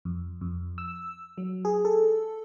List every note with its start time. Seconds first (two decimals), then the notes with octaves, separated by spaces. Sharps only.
0.05 F2
0.41 F2
0.78 E6
1.38 F#3
1.65 G#4
1.85 A4